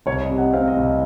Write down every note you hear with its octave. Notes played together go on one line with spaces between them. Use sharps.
C2 C#5
D#5
C3
F#5
C4 F5
D#5
C2